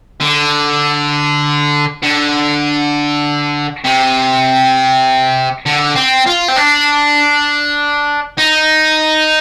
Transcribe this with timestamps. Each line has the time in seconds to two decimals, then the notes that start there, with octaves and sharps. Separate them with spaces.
0.21 D3
2.03 D3
3.85 C3
5.66 D3
5.96 C4
6.27 F4
6.48 C4
6.56 D4
8.38 D#4